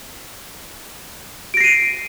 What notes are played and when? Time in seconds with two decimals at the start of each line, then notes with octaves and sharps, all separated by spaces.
1.54 D7
1.57 A#6
1.60 C7
1.64 D#7